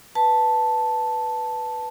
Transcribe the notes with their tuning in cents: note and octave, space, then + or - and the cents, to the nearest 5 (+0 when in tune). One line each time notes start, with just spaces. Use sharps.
B4 +0 A5 +0